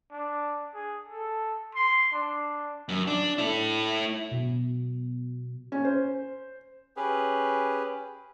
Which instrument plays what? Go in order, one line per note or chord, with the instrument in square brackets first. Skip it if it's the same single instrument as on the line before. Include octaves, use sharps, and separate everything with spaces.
[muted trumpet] D4
G#4
A4
C6
D4
[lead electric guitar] F#2
D4
A3 E4
[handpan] B2
[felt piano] C#4
C5
[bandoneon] C#4 G4 G#4 B4